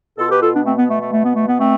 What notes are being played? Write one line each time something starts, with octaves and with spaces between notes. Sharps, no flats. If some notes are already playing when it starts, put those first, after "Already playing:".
B2 F4 A4
G4 B4
F4 A4
B3 D4
A3 C4
B3
A3
A3
A3
B3
A3
B3
A3 C4